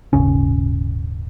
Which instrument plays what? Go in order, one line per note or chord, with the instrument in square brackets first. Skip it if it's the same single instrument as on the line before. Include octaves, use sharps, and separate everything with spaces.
[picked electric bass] D#1 G#1 C#3 C#4